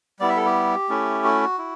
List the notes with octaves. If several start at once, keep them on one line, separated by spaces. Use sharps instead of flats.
G3 B3 E4 D5
E5
A4
G4
A3 C#4 E4
F#4
E4